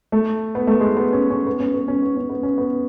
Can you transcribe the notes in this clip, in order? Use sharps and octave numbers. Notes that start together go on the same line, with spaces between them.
A3
B3
A3
G#3
B3
C#4
C#4
B3
C#4
B3
C#4
B3
C#4
B3
C#4
B3